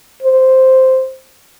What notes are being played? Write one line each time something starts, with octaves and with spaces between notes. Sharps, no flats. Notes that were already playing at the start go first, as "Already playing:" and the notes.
C5